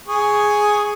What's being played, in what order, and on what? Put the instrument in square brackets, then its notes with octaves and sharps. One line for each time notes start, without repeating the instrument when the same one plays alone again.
[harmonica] G#4 C#6